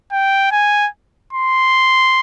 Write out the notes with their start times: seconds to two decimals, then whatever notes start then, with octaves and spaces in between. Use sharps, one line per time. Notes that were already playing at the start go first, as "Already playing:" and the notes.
0.12 G5
0.52 G#5
1.33 C6